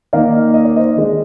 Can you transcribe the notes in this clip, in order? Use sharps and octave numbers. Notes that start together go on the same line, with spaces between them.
D#3 A#3 D#4 D5 F5
D#5
D5
C5 D#5
D#3 G#3 D4